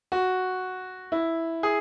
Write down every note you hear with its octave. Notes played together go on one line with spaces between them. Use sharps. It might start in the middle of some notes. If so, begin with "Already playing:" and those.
F#4
E4
G#4